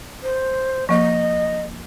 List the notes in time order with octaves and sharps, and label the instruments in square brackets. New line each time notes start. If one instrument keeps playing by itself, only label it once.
[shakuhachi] C5
[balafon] F3 A#3 [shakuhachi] D#5